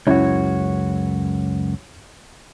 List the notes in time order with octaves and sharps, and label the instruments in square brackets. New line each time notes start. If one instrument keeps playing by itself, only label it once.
[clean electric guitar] C#2 F#2 F#4 [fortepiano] C#4 E4 C#5